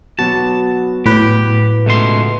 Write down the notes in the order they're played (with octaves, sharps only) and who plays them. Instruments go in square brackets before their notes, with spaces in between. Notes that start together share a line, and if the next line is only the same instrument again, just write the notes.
[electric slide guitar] F#3 B3 F#4 [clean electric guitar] A5
[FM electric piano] A2 B4 [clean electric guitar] G4
[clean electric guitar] C#2 B2 C6 [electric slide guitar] A3